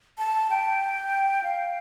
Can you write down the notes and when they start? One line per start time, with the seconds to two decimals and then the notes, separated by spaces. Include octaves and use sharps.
0.18 A5
0.50 G5
1.43 F5